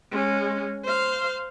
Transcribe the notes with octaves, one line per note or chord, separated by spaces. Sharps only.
G#3 C#4
C5 F5